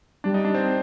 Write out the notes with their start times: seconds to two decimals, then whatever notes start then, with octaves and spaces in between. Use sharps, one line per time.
0.24 G3 D4
0.34 D#4
0.45 D4
0.54 C4